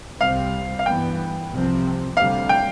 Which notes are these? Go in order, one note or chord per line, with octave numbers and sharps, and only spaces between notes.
C2 C3 G3 C4 F5
F5
G2 E3 B3 G5
C2 C3 F3 C4
D2 C3 G3 F5
G5